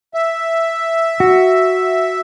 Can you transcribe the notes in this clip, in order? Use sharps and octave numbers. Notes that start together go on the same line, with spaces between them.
E5
F#4